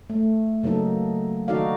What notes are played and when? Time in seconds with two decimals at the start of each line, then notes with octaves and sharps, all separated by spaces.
0.10 A3
0.63 C#3 F#3 A#3 D#4 A4
1.48 D#3 D#4 F#4 A4 D5 F5